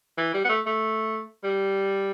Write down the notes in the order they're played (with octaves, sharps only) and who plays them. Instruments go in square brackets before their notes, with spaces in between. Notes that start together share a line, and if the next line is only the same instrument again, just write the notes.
[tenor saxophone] E3
G3
B3
A3
A3
G3